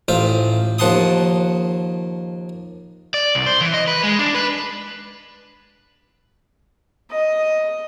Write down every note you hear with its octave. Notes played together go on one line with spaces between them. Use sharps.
A1 F4 C5 E5
D#2 F3 F#5 A5 C6 D#6
D5
C2
C5
E3
D#5
B4
G#3
D4
B4
D#5